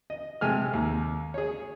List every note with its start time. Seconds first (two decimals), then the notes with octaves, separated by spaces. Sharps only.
0.10 D#5
0.41 C3 G#3 A4 G#5 F6
0.73 D#2
1.34 G#4 C#5